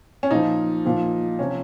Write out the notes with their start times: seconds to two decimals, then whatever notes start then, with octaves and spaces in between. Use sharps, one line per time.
0.23 C#4
0.31 A#2 F3 D#4
0.85 A#2 F3
1.39 C3 F3 C#4